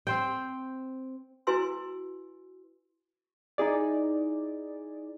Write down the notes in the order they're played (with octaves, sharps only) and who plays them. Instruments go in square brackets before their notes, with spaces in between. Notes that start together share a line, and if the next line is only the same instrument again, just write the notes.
[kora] C4 C5 G5
[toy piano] E4 F#4 B4 G#5 C6 E6
[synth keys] D#4 E4 G#4 D5